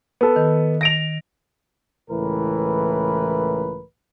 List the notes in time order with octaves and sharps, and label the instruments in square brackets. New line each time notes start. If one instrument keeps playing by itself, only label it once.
[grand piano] B3 A4
[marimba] D#3
[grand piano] A#6 D7 F7
[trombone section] C#2 A2 E3 A#4 B4